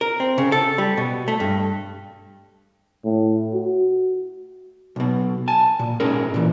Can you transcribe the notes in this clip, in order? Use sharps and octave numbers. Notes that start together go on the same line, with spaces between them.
A#4
C4
C#3
A4
G3
B2
A3
G2
A2
F#4
B1 B2
G#5 A5
A#2
G#2 C#4 G#4 A#4
A#2 E3